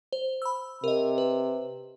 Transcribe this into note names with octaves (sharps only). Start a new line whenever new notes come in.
C5
B5 E6
C3 A#4 D#5
B4